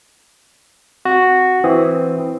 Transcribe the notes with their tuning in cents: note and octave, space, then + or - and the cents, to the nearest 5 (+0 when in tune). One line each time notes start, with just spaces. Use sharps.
C4 +0 F#4 +0
E3 +0 C4 +0 D#6 +0